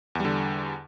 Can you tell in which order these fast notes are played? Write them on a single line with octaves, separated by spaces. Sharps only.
E2 G3 D3